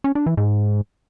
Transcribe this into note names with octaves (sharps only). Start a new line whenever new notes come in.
C#4
D4
E3
G#2